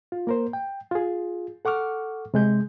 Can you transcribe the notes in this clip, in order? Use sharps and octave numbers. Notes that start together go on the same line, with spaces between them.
F4
A#3 A#4 C5
G5
F4 G#4
A4 F#5 C#6 D6 F6
C3 G#3 G6